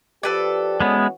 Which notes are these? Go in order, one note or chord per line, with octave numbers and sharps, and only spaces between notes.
F3 G4 A4 B4 D5
E3 G#3 B3 C#4 F#4